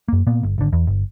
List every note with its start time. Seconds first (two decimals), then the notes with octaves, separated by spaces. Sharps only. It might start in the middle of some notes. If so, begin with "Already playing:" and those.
0.08 F#2 A#3
0.27 A#2 A#3 B3
0.43 G1
0.58 G#1 D3
0.73 E2
0.87 G1